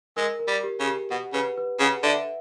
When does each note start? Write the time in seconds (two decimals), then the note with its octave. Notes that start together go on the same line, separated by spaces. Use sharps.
0.17 G#3 A#4
0.39 A#4
0.48 G3
0.64 G4
0.80 C#3
0.87 G4
1.11 B2 F#5
1.34 C#3 B4
1.58 B4
1.80 C#3 F#5
2.03 D3 E5